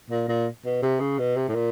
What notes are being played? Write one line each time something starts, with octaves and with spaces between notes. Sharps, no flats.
A#2
A#2
B2
C3
C#3
B2
C3
A2
A#2